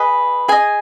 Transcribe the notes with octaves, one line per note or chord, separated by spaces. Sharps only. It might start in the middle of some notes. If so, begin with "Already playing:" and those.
Already playing: G#4 B4 D#5
G#4 D#5 G#5